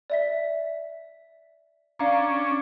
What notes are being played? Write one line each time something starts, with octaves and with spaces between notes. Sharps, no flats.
D5 E5 B6
C#4 D4 D5 F5 A#5